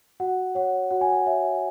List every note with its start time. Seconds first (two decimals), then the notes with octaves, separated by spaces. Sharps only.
0.20 F#4 F#5
0.55 C#5 F#5
0.91 F#4 F#5
1.01 G#5
1.12 F#5
1.26 C#5 E5